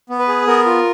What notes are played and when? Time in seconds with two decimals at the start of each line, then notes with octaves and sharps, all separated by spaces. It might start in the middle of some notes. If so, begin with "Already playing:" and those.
0.09 B3
0.19 B4
0.28 G#4
0.47 B3 A#4
0.66 F4